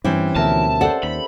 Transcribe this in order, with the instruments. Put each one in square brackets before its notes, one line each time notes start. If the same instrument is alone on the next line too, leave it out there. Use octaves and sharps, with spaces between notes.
[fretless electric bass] G2 [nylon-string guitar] E3 E4 [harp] C4 C#4 G4
[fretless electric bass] D2 B2 F3 [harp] A#4 E5 [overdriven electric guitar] A5
[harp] A4 C5 [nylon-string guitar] D5 F#5
[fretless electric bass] D#2 [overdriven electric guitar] B5